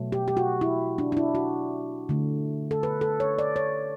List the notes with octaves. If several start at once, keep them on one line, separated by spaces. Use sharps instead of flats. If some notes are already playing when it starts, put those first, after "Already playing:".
Already playing: B2 F#3 A3
G4
G4
F#4
E4
D4
D4
E4
F#4
D3 A3
A4
B4
A4
C#5
D5
C#5